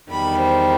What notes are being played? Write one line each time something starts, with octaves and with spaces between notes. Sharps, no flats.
E2 D#3 G3 B5
C5